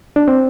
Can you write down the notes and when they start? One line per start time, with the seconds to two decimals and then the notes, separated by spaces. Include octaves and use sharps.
0.16 D4
0.28 C4